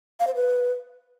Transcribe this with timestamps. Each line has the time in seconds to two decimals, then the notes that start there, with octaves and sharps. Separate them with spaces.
0.20 F5
0.27 C5
0.35 B4